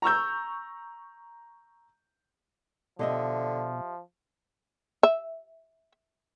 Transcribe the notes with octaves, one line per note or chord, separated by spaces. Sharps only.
A#5 C#6 E6 G6
B2 D3 F3 G4 D#5 E5
E5